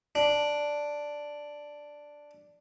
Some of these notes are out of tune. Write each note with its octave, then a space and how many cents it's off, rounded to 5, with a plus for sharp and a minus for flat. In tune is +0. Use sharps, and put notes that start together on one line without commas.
D4 +0